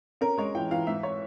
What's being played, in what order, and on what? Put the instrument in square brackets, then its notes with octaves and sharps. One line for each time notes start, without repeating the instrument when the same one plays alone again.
[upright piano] C#4 A#4
G#3 C#5
E3 G5
E3 F5
G#2 E5
C#5